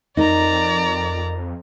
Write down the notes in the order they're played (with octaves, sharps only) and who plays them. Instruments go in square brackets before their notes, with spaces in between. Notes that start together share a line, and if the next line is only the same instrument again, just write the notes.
[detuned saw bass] F2 [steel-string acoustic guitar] D#4 A#4 [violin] D5 A#5